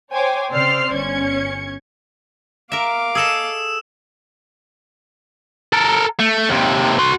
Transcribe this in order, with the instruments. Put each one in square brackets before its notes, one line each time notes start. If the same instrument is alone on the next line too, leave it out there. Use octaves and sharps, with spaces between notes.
[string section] C5 C#5 G5 G#5 D6
C#3 C4 C5 D5 F6 C7
G1 C#4 G#6 C#7
[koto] A#4 E5 [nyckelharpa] F5 D6
[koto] G#4 A4 D#5 [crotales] D#6 E6 E7
[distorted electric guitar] A4 A#4
A3
D#2 C3
F#4 C6